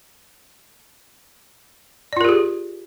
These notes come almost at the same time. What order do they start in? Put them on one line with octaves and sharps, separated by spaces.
D5 F4 A#4 G4 G#4